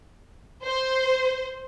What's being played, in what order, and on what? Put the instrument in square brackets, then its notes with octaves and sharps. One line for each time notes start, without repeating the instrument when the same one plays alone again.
[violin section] C5